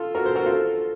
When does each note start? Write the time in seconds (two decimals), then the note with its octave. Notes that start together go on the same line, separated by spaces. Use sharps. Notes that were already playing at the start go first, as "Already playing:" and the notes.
Already playing: F4 A4
0.15 F#4 A#4
0.25 A4 C5
0.36 F#4 A#4
0.46 F4 A4